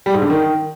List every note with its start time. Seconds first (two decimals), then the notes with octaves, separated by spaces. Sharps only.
0.06 G3
0.14 G#2
0.22 D3
0.30 D#3